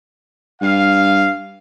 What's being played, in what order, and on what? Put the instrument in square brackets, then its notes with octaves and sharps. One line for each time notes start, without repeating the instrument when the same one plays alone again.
[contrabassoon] G2 [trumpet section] F5